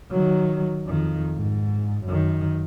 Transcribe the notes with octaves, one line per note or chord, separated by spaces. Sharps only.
D#3 F#3
F2 D#3
G#2
F#2 D#3